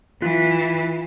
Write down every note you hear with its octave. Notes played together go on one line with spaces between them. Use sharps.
E3 F4